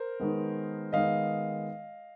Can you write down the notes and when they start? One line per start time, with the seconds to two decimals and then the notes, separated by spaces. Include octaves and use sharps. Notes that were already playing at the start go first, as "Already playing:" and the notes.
Already playing: A#4 C5
0.20 D#3 G#3 B3
0.93 D#3 G#3 B3 D#5 F5